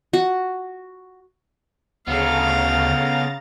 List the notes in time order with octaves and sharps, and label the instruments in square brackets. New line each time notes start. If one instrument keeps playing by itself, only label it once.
[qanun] F#4
[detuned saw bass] D2 [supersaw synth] C#3 A#5 A6 [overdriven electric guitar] B3 A4 [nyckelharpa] F5